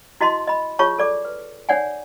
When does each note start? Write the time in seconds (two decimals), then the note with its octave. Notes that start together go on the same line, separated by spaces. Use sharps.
0.21 E4 F#4 D#5 A5 C6
0.47 D#5 B5
0.79 F4 G#4 C#5 A5 C#6
0.99 A4 D5 D6
1.25 B4
1.69 D#4 C#5 D5 F#5 G#5